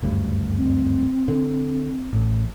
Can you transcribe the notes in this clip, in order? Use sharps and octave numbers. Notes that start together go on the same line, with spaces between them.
F#1 D2 G2
C4
D3
A1